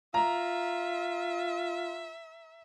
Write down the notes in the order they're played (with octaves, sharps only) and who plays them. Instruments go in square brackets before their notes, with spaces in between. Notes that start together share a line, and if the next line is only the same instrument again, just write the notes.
[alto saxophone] F4 [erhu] E5 [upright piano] A#5